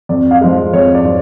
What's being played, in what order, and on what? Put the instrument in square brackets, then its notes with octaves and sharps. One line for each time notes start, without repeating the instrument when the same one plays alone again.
[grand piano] F2 D5
F5
F3 G#3
F2 C#5
D5
F3